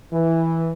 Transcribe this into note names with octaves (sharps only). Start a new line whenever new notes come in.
E3